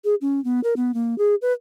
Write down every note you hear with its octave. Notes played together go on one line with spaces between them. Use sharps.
G#4
C#4
B3
A#4
B3
A#3
G#4
B4